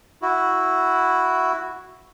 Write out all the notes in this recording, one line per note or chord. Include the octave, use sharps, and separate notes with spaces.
E4 F#4